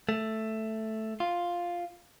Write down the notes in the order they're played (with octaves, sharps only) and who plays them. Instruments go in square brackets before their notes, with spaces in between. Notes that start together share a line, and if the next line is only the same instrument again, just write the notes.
[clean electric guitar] A3
F4